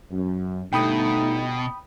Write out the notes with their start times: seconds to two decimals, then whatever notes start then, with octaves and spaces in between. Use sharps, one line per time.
0.10 F#2
0.73 G1 B2 A3 D#4 G5 B5 D#6